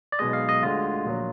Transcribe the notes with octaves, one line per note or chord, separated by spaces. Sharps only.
D5
B1 B2 G#3 D#5
F5
D#5
D2 D3 G#3 F4
A#1 A#2 F#3